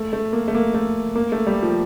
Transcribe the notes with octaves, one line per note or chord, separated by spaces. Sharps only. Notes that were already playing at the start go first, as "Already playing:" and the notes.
Already playing: A3
A3
A#3
A3
A#3
A3
A#3
A3
G3
F3